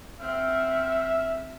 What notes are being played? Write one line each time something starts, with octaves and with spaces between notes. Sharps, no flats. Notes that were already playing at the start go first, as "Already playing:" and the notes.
C4 E5 F#5 F6